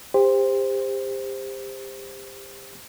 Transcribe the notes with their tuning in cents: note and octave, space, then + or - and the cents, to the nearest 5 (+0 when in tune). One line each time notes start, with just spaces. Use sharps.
G4 +30 C5 +0